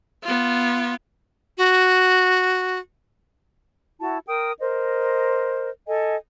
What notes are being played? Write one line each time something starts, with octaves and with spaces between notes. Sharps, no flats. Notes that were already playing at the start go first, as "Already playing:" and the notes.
B3 F4
F#4
E4 F#4 A5
A#4 G5 D#6
A#4 C5 D#5
A4 D#5 G#5